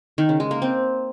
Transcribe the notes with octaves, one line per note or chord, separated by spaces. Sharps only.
D#3
C#3
G#3
A#3
C4